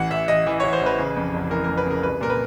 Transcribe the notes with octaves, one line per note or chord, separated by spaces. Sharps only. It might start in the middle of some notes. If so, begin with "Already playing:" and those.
Already playing: A1 E3 F#5
A1 E5
A1 D#5
E3
E3 C#5
C5
A1
B4
C#3
F2
F1
E3 A#4
F2 A#4
B4
C#3 A#4
C2 B4
A#2 A#4
B4